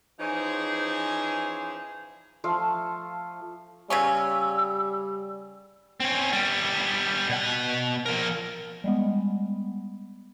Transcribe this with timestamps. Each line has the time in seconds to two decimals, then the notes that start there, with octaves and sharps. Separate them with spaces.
0.20 E3 F3 C#4 D#4 G#4 C5
2.44 F3 A3 F4
3.90 C#3 G3 B3 C#4 E6
6.00 C4 C#4
6.33 G3 B3
7.29 B2 F#5
8.06 F3 A#4
8.84 G3 G#3 B3